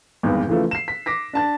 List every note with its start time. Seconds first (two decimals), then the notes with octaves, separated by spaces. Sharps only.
0.23 G#1 E2 G2
0.47 C#3 E3 F3 A3
0.71 C7 E7
0.88 B6
1.06 D6 A#6 B6
1.33 D4 A5 A6